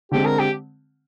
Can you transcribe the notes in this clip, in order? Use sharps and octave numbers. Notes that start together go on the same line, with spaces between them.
D3 G#3 C4 G4
A#4
G4